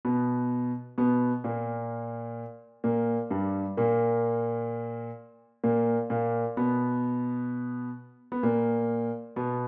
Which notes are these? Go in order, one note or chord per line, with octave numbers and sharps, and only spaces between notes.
B2 B3
B2 B3
A#2 A#3
A#2 A#3
G2 G3
A#2 A#3
A#2 A#3
A#2 A#3
B2 B3
B3
A#2 A#3
B2 B3